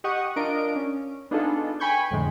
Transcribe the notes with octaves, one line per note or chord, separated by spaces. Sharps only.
G4 D#5 F#5 C#6 D#6
D4 F4 A#4 D#5 D7
C#4
B3 D4 D#4 F4 G#4 A4
G5 G#5 B5 C#6 G6 G#6
F2 A2 D3 G#3